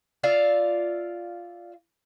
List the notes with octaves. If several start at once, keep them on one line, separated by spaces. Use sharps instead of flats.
F4 D5 E5 F5